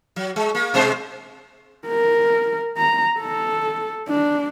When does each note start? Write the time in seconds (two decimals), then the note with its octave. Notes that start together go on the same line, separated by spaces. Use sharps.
0.16 F#3
0.36 G#3
0.55 A#3
0.74 B2 G#3 C5
1.88 A#4
2.77 A#5
3.20 A4
4.08 D4